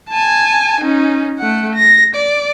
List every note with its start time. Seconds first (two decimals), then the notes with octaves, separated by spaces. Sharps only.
0.10 G#5 A5
0.81 C#4 D#4
1.39 A3 F#5
1.76 A#6
2.16 D5